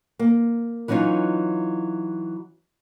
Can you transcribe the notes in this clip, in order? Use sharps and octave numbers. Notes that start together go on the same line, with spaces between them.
A#3
E3 F#3 C#4 D#4 F4